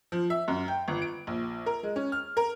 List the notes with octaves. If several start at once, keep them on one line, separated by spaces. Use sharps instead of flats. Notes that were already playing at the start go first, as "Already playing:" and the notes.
F3
E5
F#2
G5
G1
D7
A#1
A#4
G#3
C#4
F6
A#4